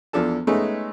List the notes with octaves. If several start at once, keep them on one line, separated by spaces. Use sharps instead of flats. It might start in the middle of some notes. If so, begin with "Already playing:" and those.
E2 F3 D4 A4 A5
G#3 A3 B3 C#4 D#4